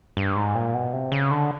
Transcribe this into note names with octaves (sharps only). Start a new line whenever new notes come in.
G2
G#2
A#2
B2
C3
C#3
D3